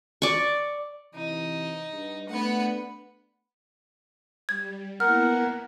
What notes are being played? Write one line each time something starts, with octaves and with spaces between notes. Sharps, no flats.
D5 C#6
C3 E3 D#4
G2
A3 B3 D4 F#5
G3 G#6
A#3 B3 E4 A#4 F#5 F6